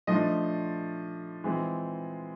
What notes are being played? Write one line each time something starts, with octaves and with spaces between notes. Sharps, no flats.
F3 A3 D4 F4 D#5
E3 G#3 C4 F4